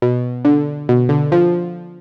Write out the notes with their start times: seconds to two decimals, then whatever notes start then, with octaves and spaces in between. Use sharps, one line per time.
0.02 B2
0.45 D3
0.89 B2
1.09 D3
1.32 F3